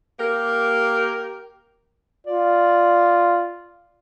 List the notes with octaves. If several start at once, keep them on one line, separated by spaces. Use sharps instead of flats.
A#3 G4 A#4
F4 D5